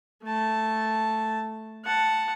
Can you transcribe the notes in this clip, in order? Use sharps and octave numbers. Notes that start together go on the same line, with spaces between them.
A3 A5
F#5 A5